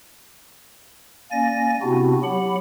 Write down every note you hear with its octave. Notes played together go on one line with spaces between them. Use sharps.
A#3 C#4 D5 G#5 A#6
C3 B3 C4 D4 E4 F#4
F#3 G4 F#5 B5